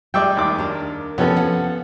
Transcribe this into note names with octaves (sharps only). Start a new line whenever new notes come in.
G3 G#3 D5 E5 G5
D#2 D6
D4 A#4
C3 F3 B3 C#4 A4
F3 F#5